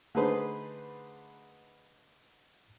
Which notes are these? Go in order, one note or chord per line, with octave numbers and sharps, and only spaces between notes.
D3 A3 D#4 G#4 B4 C5